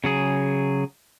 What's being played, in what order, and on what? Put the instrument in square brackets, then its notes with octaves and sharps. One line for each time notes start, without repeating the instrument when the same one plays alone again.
[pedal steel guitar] C#3 F#3 G#4